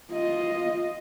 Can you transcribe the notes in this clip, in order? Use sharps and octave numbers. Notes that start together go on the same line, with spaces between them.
F4 D#5